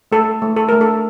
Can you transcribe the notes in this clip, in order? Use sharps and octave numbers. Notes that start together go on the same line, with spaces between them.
A3 A4
A3
A4
A3 A#4
A4